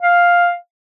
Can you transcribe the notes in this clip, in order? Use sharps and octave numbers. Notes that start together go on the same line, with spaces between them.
F5